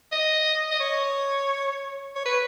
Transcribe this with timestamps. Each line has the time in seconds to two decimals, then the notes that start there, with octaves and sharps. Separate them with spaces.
0.12 D#5
0.71 D#5
0.80 C#5
2.15 C#5
2.26 B4